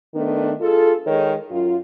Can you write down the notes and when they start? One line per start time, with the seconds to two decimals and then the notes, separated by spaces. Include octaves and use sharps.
0.14 D#3 A3 B3 D4
0.61 F4 G#4 A4
1.07 D#3 G#3 C#5
1.51 F#2 F4